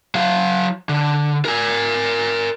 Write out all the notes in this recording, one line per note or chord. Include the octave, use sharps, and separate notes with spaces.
F#3 F5
D3
A#4 G#5